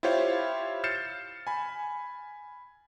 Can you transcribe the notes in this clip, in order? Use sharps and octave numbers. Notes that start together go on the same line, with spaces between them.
E4 F4 G4 C5 C#5 F5
F6 G6 A6 C7 C#7 E7
G#5 B5